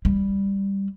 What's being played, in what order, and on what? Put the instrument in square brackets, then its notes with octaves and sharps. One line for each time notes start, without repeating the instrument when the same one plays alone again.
[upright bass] G3